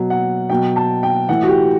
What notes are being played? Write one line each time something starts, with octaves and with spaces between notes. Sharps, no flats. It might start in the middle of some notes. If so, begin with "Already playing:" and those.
Already playing: B2 F#3
F#5
B2 F#3 G5
A5
G5
A2 E3 F#5
F#4
G4